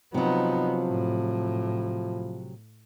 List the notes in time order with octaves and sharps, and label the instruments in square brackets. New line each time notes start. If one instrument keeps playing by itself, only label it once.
[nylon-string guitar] C3 F#3 [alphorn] F3 [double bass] B3 D#4
[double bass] A2